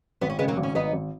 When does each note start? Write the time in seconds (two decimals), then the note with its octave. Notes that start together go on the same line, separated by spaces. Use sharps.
0.21 G#1 B3
0.30 C#4
0.39 C#3 G#3 B3
0.48 F#3 A#3
0.57 G#1
0.63 C#4
0.75 G#1 B3 D#4
0.93 G#1